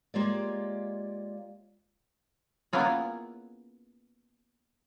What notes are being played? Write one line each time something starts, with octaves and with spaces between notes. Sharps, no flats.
G#3 A#3 F4 G4 C#5 D5
A#3 B3 C#4 E4 F4 G#4